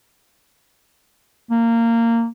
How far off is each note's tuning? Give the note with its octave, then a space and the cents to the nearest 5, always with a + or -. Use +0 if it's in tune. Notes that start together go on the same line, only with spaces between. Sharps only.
A#3 -15